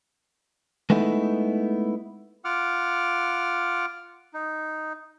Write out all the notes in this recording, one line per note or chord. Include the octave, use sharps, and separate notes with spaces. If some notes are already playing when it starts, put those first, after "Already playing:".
G#3 A3 B3 D#4 E4
F4 F#5 D6 F6
D#4